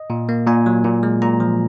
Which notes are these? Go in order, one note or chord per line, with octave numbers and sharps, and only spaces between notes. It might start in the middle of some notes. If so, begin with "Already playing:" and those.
Already playing: D#5
A#2
A#3
A#2 G#5
F#3
A#2
G#3
A#2 A#5
F3